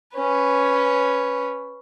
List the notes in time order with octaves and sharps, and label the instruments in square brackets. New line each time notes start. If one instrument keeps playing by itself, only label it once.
[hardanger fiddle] C#4 B4